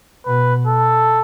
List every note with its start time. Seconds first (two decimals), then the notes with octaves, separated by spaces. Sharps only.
0.26 B2 B4
0.67 A4